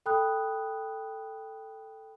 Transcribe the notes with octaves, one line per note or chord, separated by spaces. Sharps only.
A4 G5 B5 D#6 F#6